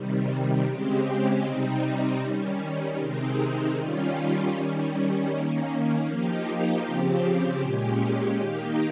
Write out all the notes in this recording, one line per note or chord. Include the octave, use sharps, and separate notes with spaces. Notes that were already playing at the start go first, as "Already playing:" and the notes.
Already playing: C3 D#3 G3
C#3 G#3 C4 G4
C3 G3 C4 D#4
D#3 G3 C#4
C3 D#3 G#3 C4 D#4
D#3 G3 C#4 F4
D#3 G3 C#4
D#3 A#3 C#4
F3 A#3 D#4 G4
C#3 F3 C4 G4
A#2 G#3 C#4 G4
D#3 A#3 D#4 G4